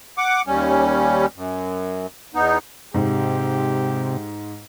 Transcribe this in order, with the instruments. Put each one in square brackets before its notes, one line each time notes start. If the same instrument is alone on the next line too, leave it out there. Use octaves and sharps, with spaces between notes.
[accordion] F#5 D6
D#2 G3 C#4
F#2
E2 B3 D#4
[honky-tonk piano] G#2 [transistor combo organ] C3 [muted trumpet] G4